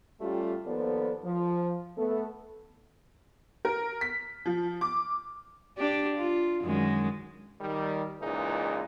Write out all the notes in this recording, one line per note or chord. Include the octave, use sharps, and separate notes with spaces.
G3 A3 C#4 F4 G4
D#2 F3 B3 A4 C5 D5
F3
A3 B3 A4
A#4
B6
F3
D6
D4 G4
F4
F#2 D#3 G#3
D#3 G3
C#2 A#2 E3 D#4 G#4